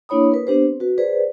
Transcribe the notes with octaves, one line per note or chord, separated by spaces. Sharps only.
A#3 D4 E4 C#5 B5 D#6
A#4 B4
B3 D4 G4 C5
C4
F#4 B4
G#4 B4 C5 D5